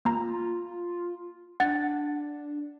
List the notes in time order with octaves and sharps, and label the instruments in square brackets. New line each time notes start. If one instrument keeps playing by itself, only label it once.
[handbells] A#3 A#5 [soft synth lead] F4
[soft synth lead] D4 [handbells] F#5 A6